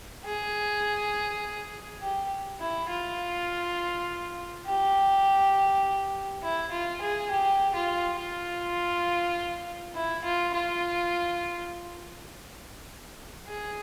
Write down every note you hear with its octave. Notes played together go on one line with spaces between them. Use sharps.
G#4
G4
E4
F4
G4
E4
F4
G#4
G4
F4
F4
E4
F4
F4
G#4